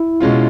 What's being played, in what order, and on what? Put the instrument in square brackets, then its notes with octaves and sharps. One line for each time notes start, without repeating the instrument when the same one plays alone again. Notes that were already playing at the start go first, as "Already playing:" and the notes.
Already playing: [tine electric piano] E4
[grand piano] B2 G#3 C#4 F4